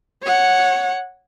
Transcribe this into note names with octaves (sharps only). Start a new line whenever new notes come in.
C#5 F#5